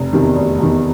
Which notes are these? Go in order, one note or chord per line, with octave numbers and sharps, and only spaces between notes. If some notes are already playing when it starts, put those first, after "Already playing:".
Already playing: F1
E2 C3 D#3
F1
E2 C3 D#3